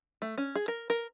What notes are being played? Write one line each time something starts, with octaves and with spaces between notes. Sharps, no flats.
A3
C#4
G#4
A#4
A#4